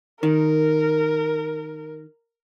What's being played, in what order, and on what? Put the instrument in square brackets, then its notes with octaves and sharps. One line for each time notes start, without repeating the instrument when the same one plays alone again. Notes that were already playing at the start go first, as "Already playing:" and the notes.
[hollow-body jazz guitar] D#3 [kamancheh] A#4